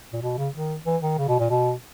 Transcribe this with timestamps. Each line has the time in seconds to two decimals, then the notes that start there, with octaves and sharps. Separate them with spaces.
0.13 A#2
0.22 B2
0.37 C#3
0.54 D#3
0.86 E3
1.02 D#3
1.18 C#3
1.28 B2
1.39 A#2
1.50 B2